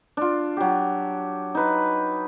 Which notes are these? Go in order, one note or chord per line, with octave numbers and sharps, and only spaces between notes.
D4 F4
F#3 G4
D#4 B4